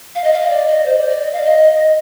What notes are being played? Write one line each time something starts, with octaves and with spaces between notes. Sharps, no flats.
F5
D#5
F5
D#5
D5
D#5
C5
D5
D5
D#5
F5
D#5